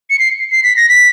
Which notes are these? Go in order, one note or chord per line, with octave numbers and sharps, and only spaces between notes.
C#7
C7
C7
B6
A#6
B6